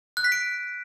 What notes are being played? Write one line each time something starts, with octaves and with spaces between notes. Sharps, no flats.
F#6
B6
D7